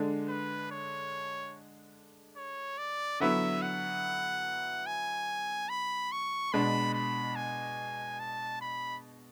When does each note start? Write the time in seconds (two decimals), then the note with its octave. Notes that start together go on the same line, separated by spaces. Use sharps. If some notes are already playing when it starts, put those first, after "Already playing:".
Already playing: D3 G#3 D4
0.28 B4
0.71 C#5
2.37 C#5
2.78 D5
3.20 D3 F#3 B3 E4 E5
3.62 F#5
4.86 G#5
5.69 B5
6.12 C#6
6.53 B2 G#3 D4 B5
6.94 B5
7.36 G#5
8.20 A5
8.61 B5